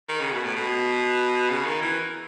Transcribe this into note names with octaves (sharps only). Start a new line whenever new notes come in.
D#3
C#3
B2
A2
B2
C#3
D#3
E3